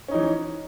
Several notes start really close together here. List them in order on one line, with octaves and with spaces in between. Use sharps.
C#4 D#4 E3